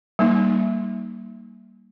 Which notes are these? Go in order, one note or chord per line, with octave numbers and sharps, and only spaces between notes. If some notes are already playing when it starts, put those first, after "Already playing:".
G3 A#3 D#4